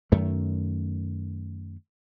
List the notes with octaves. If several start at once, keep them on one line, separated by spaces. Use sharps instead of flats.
F#2 D#3 A3